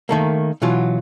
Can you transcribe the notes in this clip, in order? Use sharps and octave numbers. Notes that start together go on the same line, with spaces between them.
D#3 A3 A#3
B2 E3 F#3 F4